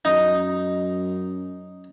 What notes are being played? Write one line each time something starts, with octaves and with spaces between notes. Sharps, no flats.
F#2 D#4